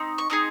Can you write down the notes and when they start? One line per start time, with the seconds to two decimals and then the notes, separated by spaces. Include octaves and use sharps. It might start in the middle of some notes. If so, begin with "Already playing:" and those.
Already playing: C4 D#4
0.18 C#6
0.30 C4 D#4 G#4 D#6